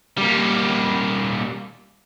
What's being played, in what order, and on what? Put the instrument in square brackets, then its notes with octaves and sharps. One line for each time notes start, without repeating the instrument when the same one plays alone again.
[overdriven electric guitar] G3 A#3